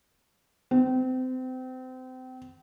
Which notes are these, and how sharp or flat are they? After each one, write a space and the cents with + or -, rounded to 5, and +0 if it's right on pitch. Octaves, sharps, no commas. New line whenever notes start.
C4 -30